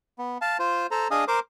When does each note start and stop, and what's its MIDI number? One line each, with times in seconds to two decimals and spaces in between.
0.19 0.38 59
0.42 0.57 77
0.42 0.57 81
0.59 0.87 65
0.59 0.87 72
0.91 1.08 69
0.91 1.08 72
0.91 1.08 82
1.11 1.24 62
1.11 1.24 68
1.11 1.24 75
1.11 1.24 77
1.11 1.24 80
1.11 1.24 87
1.28 1.40 70
1.28 1.40 72
1.28 1.40 84
1.28 1.40 86